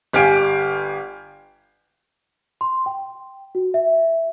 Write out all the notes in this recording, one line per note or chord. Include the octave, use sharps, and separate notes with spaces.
G1 G4 F5 G#5 D7
C6
G5
F#4
E5